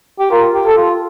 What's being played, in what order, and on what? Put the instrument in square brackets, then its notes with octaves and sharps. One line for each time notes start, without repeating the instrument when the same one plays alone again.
[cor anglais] G4
[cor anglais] F4 [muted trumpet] A#4
[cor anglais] G4
[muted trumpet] A4
[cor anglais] F4